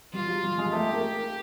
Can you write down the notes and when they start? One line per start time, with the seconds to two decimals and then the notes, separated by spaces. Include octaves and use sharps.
0.13 G3 F4
0.27 F#3
0.43 G3
0.58 G#3
0.73 A3 G4
0.93 A#3
1.13 A#3